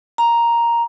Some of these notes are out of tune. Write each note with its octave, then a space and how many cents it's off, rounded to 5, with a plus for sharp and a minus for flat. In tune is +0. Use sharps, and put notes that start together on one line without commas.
A#5 +5